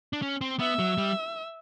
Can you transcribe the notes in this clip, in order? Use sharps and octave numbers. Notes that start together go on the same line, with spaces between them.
D4
C#4
C4
B3 E5
F#3
G3